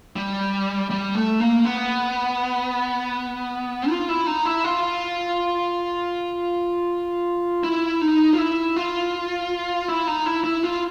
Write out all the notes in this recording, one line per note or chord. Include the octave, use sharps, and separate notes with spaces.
G3
G3
A3
A#3
B3
F4
E4
D#4
E4
F4
E4
D#4
F4
E4
F4
E4
D#4
E4
E4
F4